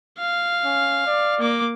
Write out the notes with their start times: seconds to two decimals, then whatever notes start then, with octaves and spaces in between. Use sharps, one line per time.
0.19 F5
0.65 C#4
1.07 D5
1.39 A#3 D6